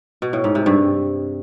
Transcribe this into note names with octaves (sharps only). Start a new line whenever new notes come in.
B2
A2
G#2
C3
G2